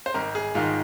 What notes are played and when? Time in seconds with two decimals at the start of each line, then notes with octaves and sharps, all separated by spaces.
0.06 C5
0.14 G#1 A#4
0.35 G#4
0.55 G#2 D#3 F4